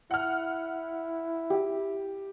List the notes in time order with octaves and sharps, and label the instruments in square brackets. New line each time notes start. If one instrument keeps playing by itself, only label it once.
[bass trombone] E4 [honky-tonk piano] F#5 F6
[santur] G4